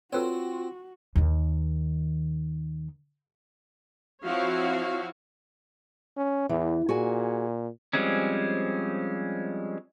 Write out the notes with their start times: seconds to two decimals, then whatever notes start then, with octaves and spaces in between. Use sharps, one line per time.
0.13 C4 F4 F#4 A4 B4 C#5
1.16 D#2 D#3
4.25 F3 C4 E4 F#4 C#5 F5
6.17 C#4
6.49 E2 E3
6.89 A#2 F#4 G#4 G#5
7.93 F3 G3 G#3 C4 C#4